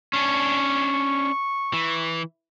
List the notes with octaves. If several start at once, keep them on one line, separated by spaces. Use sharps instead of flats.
C#4 D4 C#6
E3